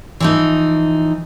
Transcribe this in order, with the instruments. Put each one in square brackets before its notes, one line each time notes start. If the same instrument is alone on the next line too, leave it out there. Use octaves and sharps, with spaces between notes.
[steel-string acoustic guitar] E3 F3 D#4